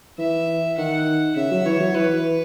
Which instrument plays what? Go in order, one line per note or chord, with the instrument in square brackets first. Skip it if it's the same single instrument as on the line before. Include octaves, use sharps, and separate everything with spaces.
[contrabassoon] E3 [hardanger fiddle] E5
[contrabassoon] D#3 [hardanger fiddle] F#5
[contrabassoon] C#3 [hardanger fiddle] E5
[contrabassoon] F#3
[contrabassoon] E3 [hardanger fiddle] C#5
[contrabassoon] F#3
[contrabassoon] E3 [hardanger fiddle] B4